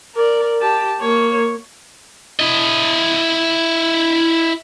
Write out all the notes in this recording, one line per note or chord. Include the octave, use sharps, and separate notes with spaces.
A#4 D5
G4 A5
A#3 C#5
E4 D#5